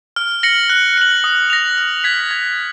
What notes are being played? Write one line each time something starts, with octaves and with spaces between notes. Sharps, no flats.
F6
A#6 C#7 F#7
F#6
C#7 F#7
D#6
A#6 F7
F6
G#6 B6
G#6